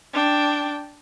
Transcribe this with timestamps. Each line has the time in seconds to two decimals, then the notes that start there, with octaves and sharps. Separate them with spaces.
0.13 D4 G5